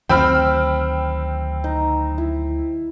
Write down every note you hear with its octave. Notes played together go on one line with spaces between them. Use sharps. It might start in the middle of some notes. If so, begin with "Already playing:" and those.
D2 D#3 F#3 C4 G5 B5 E6 F6
D#4
E4